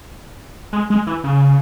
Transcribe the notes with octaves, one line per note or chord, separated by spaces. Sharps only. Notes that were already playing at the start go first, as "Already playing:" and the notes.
G#3
G#3
E3
C#3